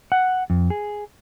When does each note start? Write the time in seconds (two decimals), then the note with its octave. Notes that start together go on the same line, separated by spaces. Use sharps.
0.12 F#5
0.50 F2
0.70 G#4